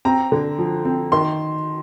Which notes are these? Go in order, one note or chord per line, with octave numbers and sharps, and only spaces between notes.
C4 A#5
D3
F3
C4
D#3 C6